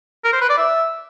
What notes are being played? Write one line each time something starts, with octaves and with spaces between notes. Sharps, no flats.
A#4
C5
B4
D5
E5